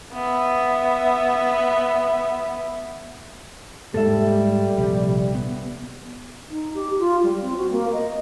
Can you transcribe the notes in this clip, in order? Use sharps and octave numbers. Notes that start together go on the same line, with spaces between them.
B3 E5
G#2 G3 A#3 A4 E5
A#1 C3
B3
D#4
G4
F4
G3
C4
F#4
A#3
D#5